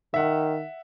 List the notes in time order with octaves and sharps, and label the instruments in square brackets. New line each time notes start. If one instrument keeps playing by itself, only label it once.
[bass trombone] D#3 [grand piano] E5 F#5